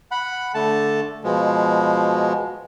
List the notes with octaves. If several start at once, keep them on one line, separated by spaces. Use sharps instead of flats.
F#5 B5
D3 A3 A5
B2 F3 G#3